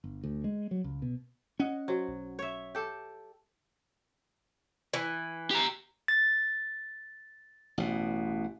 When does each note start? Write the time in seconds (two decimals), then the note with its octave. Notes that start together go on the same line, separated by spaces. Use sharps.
0.04 G1
0.24 D2
0.44 G#3
0.71 F#3
0.84 C#2
1.02 B2
1.60 C#4 D#5 F#5
1.88 F#3 F#4 C5
2.08 B1
2.39 C#5 E5
2.75 G4 A4
4.94 E3
5.51 G4 A#5
6.08 A6
7.78 A1 B2